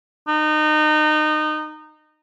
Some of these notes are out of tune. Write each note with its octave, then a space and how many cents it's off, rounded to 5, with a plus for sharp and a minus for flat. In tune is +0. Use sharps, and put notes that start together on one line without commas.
D#4 -25